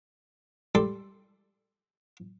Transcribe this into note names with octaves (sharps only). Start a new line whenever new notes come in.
G3 A4 C6 D6